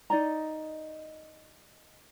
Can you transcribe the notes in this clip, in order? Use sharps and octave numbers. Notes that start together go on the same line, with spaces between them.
D#4 D5 D#5 A#5